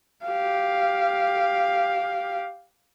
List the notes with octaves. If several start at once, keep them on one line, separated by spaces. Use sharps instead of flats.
G4 F5